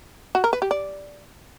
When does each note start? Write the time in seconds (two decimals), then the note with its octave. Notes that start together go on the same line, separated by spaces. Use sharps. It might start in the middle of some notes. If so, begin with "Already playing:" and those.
0.35 F#4
0.44 A#4
0.53 B4
0.62 G4
0.71 D5